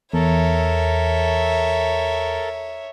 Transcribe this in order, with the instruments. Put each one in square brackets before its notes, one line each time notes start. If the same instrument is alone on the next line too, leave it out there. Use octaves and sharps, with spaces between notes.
[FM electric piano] E2 [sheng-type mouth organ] A4 A#4 [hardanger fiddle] C#5 E5